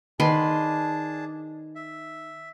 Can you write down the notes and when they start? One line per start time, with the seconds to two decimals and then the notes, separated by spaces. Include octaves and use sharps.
0.20 D#3 D4 G#4 B4 A5 C6
1.75 E5